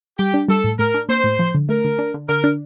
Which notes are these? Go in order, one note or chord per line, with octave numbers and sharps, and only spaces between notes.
G3 G4
D4
G3 A4
A2
A2 A#4
D4
A#3 C5
A2
F3
D3
A3 A#4
D3
D4
D3
D3 A#4
D4